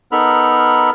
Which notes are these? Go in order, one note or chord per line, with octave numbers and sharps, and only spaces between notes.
B3 D#4 A4 A#4 B5 F6